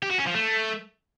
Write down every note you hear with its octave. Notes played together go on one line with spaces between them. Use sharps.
G4
F#4
C#4
F3
A3